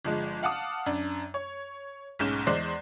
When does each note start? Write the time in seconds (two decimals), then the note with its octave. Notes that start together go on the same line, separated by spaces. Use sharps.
0.05 G1 F3 G#3
0.43 F5 F#5 A5 D6 D#6
0.86 F#2 D4
1.34 C#5
2.19 B1 G#2 C#4 G6 E7
2.47 E2 G#3 C5 D5 F#6 C7